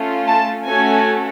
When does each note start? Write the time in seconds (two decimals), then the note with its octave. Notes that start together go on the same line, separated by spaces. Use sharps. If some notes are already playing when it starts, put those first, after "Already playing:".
Already playing: A3 C#4 F4
0.27 A5
0.67 A3 C#4 F#4 A4 G#5